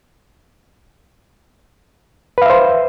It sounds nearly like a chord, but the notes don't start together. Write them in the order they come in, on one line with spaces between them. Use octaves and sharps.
B4 F5 E5 C5